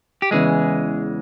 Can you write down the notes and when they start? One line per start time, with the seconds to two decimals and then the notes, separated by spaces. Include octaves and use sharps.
0.22 G4
0.31 E2 C#3 E3 G#3 G#4